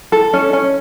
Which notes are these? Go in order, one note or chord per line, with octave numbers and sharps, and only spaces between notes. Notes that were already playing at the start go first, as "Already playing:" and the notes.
A4
C#4
C#4